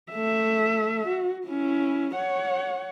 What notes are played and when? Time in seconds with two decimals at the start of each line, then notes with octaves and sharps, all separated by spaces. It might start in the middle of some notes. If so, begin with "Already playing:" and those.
0.12 A3 E5
1.07 F#4
1.47 C#4 E4
2.15 C#5 F#5